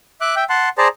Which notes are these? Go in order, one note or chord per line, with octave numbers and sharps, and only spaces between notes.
E5 D6 F#6
E5 G5
F#5 A5 C6
G#4 C5 D5 A5 A#5